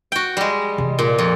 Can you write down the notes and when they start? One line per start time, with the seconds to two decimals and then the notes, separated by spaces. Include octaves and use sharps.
0.12 F#4 G5
0.37 G3 G#3
0.78 C3 E3
0.99 A#2
1.18 F2